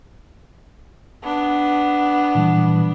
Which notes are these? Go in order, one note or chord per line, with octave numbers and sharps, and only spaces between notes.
B3 D4
A#2 E3 G3